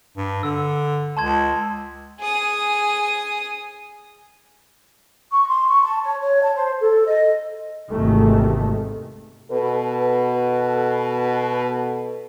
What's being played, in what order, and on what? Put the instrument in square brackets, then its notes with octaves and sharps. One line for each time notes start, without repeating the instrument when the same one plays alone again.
[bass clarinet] G2
[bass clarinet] D3 [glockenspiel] E6
[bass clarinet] C#2 [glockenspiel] A5 C6 G#6
[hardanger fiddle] G#4 D#6
[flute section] C#6
C6
C#6
A5
C#5
C#5
A5
C5
A4
D#5
[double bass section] G#1 E2 G#2 C3 D#3 A3
[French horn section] B2 A4 B4